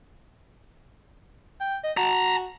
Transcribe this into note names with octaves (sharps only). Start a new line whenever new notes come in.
G5
D#5
F#4 A5 A#5